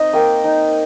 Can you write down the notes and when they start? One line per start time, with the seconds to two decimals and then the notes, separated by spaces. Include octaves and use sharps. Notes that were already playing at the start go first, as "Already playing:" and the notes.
Already playing: C4 D#4 D#5
0.13 A#3 G5
0.44 D#4